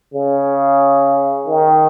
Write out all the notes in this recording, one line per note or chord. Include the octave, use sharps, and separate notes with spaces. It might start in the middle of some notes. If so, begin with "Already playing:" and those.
C#3
D#3